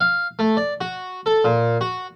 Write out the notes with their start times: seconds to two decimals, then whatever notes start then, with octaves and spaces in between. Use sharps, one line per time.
0.01 F5
0.39 A3
0.57 D5
0.81 F#4
1.26 A4
1.45 A#2
1.81 F#4